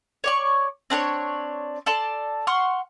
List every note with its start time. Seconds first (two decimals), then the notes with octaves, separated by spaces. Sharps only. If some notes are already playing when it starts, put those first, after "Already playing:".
0.24 C#5 D5 C#6
0.90 C4 D4 A#4 C#5
1.86 A4 D5 A5 C6
2.47 F#5 C6 C#6 F6